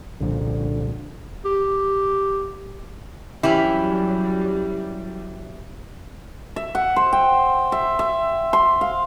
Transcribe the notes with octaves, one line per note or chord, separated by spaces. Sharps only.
C2 A#2 D3 F3
G4
E3 F#3 G3 C#4 E4 G4
E5
F#5
C5
G5
E5
E5
C6
F5